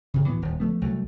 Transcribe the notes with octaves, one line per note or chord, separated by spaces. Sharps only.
A2 C#3
D2 E3 B3
D#1
F3 A3 B3
C2 F#3 A3